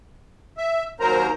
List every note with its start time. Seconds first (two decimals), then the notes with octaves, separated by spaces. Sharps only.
0.57 E5
1.00 D#2 F#3 A#4 C5 A#5